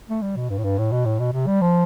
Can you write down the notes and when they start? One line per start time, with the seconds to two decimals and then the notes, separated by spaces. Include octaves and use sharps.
0.09 A3
0.22 G3
0.36 B2
0.50 G2
0.58 A2
0.64 G2
0.79 A2
0.92 B2
1.05 A2
1.19 B2
1.33 C3
1.47 G3
1.61 F3